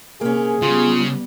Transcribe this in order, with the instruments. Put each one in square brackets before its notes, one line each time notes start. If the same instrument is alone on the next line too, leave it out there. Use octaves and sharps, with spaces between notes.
[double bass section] C3 [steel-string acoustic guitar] A#3 C#4 [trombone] G#4
[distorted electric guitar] C#3 [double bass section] G3 B3 [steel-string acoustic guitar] F4